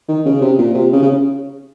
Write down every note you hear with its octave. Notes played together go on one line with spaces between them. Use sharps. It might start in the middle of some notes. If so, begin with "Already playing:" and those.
D#3
C#3
C3
A#2
C3
C#3
C#3